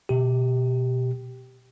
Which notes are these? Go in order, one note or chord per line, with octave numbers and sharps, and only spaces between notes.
B2 G4